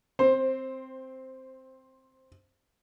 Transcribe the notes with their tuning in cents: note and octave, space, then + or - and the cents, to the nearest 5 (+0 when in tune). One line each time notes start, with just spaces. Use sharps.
C4 +0 C5 +15